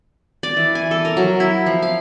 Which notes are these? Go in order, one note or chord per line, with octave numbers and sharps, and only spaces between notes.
D5
E3
G#5
A4
A#4
F#3
E4
F3
F5